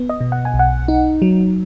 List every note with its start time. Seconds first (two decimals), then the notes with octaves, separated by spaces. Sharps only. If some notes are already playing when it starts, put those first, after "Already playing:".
Already playing: B3
0.09 D#5
0.21 B2
0.32 F#5
0.45 G#5
0.54 B1
0.59 F#5
0.88 D#4
1.22 F#3